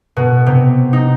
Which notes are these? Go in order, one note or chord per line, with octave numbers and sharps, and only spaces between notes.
B2
C3
D#4